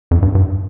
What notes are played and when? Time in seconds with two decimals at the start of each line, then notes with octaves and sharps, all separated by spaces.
0.11 F2
0.22 G2
0.35 G2